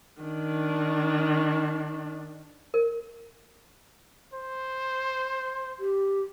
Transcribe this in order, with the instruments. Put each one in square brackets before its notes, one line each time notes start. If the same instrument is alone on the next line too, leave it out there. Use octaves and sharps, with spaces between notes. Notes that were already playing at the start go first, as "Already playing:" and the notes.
[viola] D#3 D4
[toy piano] A#4
[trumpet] C5
[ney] G4